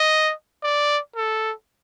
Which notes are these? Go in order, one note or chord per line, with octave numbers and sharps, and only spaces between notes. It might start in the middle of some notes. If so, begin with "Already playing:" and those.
Already playing: D#5
D5
A4